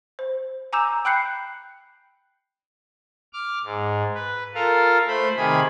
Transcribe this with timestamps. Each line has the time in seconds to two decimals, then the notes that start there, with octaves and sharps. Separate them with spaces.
0.19 C5
0.73 G#5 A#5 D6 E6 G6 E7
1.05 G5 B5 F#6 G6 C7 C#7
3.33 D6 F6
3.65 G#2
4.15 B4
4.54 F4 A4 A#4 F5
5.08 A3 C5 B5
5.37 C3 D#3 G#4 B5